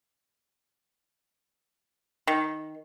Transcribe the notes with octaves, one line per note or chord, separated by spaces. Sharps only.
D#3